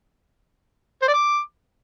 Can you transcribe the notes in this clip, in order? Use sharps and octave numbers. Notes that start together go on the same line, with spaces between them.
C5
D5
D6